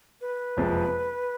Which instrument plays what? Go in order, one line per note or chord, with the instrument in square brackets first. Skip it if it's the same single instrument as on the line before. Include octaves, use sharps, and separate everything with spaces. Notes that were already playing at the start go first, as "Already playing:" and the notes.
[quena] B4
[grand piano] F#1 F2 C3 F3 G#3